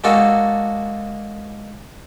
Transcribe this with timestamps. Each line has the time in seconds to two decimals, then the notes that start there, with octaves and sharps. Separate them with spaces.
0.04 G#3 A#3 D4 F#4 A4